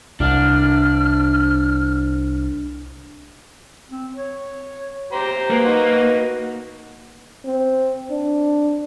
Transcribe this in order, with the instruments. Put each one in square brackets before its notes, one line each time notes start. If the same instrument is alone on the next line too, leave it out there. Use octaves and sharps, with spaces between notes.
[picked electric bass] C2 [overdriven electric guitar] D4 [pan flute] F6
[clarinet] C4
C#5
[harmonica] G4 C5 A#5
[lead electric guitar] A#3 [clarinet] B4
[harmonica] D#4 F#4
[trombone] C4
D4